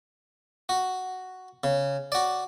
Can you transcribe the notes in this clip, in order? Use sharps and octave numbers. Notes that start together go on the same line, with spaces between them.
F#4
C#3
F#4 D5